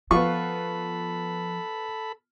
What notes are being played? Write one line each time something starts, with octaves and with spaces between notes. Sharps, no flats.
F3 B3 F4 A4 B5 C#6